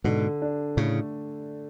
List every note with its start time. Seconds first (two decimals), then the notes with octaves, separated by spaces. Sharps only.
0.04 G#2 B2 D3
0.42 D4
0.77 A2 C#3 A3